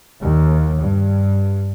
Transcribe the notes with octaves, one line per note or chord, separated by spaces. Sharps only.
D#2
G2